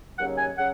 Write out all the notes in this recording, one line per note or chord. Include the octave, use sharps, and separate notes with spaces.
D#2 C#3 F#3 F#5
G#5
C#3 F#3 F#5